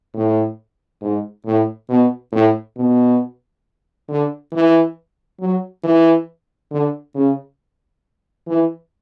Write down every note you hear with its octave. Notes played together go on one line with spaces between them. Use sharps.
A2
G#2
A2
B2
A2
B2
D3
E3
F#3
E3
D3
C#3
E3